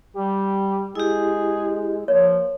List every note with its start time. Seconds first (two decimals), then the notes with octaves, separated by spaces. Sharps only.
0.16 G3 G4
0.95 G#3 E4 G4 G#4
2.08 F3 A#3 C#5